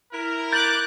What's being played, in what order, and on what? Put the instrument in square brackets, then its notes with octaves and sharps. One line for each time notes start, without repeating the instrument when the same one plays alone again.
[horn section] E4 A#4
[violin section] D6 F#6 [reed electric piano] G6 A6